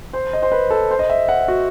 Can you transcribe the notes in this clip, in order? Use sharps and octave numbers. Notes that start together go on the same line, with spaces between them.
C5
D#5
C5
B4
A4
C5
D#5
E5
F#5
F#4